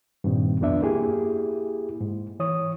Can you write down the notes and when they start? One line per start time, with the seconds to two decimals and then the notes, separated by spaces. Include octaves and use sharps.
0.24 G2 A#2 D#3 C4
0.60 C2 F2 B3 D4 E5
0.82 A#3 E4 G4 G#4
2.01 G#2
2.40 E3 C#5 D#6